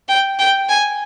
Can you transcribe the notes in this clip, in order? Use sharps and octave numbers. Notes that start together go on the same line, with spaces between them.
G5
G5
G#5